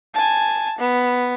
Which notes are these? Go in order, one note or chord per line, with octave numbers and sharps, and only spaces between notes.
G#5 A5
B3